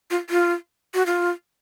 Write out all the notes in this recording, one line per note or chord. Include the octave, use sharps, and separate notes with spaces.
F4
F4
F#4
F4